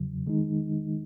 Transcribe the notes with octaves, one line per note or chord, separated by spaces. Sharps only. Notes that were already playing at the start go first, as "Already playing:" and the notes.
Already playing: E2 C#3 F#3
D#3 G#3 D#4